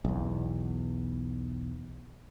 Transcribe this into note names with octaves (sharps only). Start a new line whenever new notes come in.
B1 E2